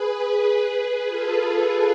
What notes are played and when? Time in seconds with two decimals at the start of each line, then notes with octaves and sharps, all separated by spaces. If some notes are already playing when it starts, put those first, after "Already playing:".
Already playing: G#4 B4
0.57 G#4 B4
1.08 F4 A4